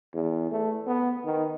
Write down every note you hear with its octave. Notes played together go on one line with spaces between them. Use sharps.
E2
A3
B3
D#3